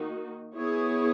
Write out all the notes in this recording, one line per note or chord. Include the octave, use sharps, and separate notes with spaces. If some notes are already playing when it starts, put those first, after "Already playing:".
Already playing: D#3 A#3 D#4 F#4
B3 E4 G#4 C#5